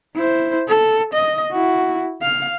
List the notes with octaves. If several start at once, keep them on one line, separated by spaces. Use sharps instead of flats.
E4 C5
A4
D#5
E4 F#4
F5